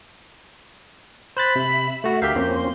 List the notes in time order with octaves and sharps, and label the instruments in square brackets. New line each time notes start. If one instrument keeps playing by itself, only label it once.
[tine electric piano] C5 F#6 A6 [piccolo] B5
[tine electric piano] C3 [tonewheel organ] E5
[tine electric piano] A3 F#4
[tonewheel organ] D2 A#4 [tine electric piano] G4 E5 F5 [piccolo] G6
[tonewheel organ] F2 C4 C#4 [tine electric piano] A#3
[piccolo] C6